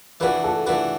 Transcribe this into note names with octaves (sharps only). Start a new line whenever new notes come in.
E3 D4 F#4 B4
A4
E3 D4 F#4 B4